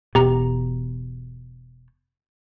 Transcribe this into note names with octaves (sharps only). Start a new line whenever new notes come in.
E1 B2 G4 A#5